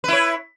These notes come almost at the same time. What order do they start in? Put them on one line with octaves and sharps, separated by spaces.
B4 E4 C#5